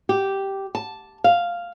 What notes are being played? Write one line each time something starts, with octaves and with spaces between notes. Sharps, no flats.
G4
A5
F5